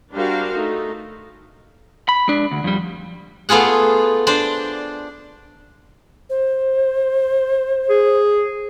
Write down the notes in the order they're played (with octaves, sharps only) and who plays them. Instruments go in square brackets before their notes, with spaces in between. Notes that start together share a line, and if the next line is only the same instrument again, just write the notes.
[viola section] G3 D4 F#4 A#4 C5 F5
A3 D#4
[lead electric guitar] B5
G#3 D4
D2
F2 G3
[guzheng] A3 B3 F4 G#4 F#5
D4 C5 D5
[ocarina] C5
[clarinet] G#4